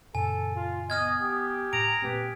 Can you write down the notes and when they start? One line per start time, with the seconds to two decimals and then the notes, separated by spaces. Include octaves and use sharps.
0.15 F#2 A#2 C#3 A4 G#5
0.56 F4
0.90 B3 D#5 D#6 F6 G#6
1.21 G4
1.73 A2 A#5 D7
2.02 A#2 A3 C4 G4 B4